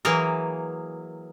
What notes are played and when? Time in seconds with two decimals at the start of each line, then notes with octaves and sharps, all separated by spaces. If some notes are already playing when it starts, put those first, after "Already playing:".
0.05 E3 F#3 A#3 G#4 A#4